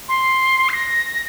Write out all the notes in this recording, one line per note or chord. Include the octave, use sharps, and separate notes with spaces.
C6
C7
A#6